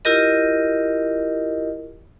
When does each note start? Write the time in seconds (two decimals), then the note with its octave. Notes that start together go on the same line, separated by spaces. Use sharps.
0.05 E4 F4 G4 A#4 D#5